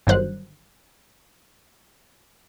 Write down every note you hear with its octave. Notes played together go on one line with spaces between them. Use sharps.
G1 G2 D#3 F#3 C5 F#6